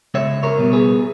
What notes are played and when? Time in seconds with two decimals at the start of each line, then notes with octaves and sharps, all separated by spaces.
0.14 C#2 C#5 E5
0.43 A#4 C#5
0.58 B2 G3 B3
0.73 G#4 B4